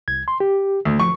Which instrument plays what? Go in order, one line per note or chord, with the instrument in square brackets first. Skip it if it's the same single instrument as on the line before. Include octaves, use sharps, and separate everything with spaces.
[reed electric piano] C2 G#6
C6
G4
[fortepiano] D2
[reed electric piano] F3 [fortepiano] C#6